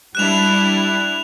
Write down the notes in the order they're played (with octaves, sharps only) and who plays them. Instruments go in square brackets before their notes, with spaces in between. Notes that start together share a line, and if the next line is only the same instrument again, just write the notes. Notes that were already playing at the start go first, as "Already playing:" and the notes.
[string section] G3 D4 E4 [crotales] F#6 E7 F7